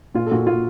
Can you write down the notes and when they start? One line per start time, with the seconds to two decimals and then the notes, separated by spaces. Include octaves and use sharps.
0.15 A#2 F4
0.26 A4
0.31 A#2 F#4
0.47 A#2 F4